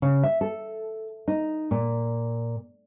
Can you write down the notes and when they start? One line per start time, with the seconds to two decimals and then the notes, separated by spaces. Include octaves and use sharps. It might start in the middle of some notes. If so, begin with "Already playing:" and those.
0.02 C#3
0.23 E5
0.41 A4
1.28 D#4
1.71 A#2